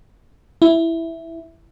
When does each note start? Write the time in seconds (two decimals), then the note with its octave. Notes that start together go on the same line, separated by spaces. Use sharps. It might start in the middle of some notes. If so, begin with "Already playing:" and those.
0.62 E4